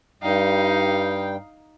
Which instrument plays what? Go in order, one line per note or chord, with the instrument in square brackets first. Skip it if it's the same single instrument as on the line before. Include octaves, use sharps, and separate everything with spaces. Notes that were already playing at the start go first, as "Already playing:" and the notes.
[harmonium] G2 G3 G5 [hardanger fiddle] D#4 F5